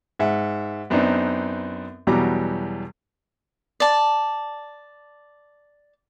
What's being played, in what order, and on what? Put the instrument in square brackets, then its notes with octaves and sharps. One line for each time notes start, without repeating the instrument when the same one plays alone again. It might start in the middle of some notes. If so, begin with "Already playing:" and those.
[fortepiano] G#2 E5 F#5
F#2 B3 C4 D4 D#4
E2 B2 F#3 G3 A#5 D6
[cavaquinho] D5 A5